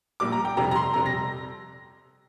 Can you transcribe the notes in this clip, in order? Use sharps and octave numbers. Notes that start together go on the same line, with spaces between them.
A#1 A#2 G3 D6
A#5
G5
F2 C3 G3 A#5
A#5
C6
F2 C3 G3 A#5
A#6